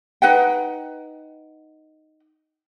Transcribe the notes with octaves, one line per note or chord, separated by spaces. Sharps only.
D#4 B4 F#5 G5